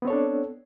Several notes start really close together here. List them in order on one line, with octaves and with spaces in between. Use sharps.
B3 C4 C#5 A4 D4